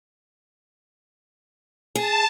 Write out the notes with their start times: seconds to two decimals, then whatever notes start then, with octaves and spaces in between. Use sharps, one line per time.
1.95 G#4 A5